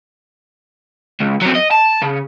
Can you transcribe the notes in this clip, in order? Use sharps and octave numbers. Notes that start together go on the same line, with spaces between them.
C#2
F#3 C4
D#5
A5
C#3